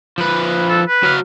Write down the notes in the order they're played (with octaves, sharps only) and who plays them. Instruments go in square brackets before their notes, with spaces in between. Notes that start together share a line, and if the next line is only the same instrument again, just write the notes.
[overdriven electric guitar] F3 B4
[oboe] A4
B4
[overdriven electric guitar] F#3 F5